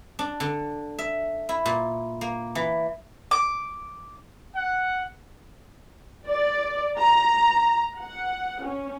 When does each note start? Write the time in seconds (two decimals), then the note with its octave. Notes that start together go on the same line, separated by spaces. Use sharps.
0.19 D4
0.40 D3
0.99 E5
1.49 E4
1.66 A#2
2.21 A#3
2.55 E3
3.31 D6
4.55 F#5
6.29 D5
6.98 A#5
7.99 F#5
8.63 C#4